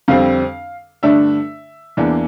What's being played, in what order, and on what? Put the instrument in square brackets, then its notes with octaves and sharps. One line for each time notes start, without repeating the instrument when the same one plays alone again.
[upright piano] F2 D3 G3 C4 F5
G2 D3 A3 D4 E5
E2 E3 A#3 D4